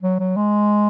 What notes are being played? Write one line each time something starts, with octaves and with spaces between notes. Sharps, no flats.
F#3
F#3
G#3